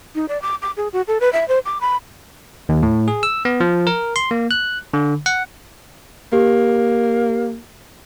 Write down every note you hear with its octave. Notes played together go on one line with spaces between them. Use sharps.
D#4
D5
D6
D6
G#4
F#4
A4
B4
E5
C5
D6
B5
D#2
A2
G#4
E6
B3
F3
A#4
C6
A#3
F#6
D3
F#5
A#3 G4